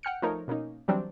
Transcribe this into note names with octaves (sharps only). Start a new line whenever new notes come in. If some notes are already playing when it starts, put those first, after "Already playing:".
F#5 G5 F6 C#7
F3 A3 D#4 A#4 C#5
B2 A#3 C#4 D#4
E3 F#3 G3 C4 D4